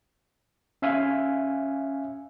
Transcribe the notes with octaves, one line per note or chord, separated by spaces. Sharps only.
C#4 E5 F5 G#5